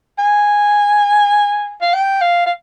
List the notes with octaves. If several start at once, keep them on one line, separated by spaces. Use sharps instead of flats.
G#5
F5
G5
F5
F5